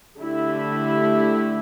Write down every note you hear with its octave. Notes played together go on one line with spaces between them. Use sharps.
D3 A3 E4 G4